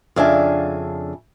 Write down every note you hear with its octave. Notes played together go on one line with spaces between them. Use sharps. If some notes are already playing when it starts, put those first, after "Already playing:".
F2 C#3 D4 E5 F5 G#5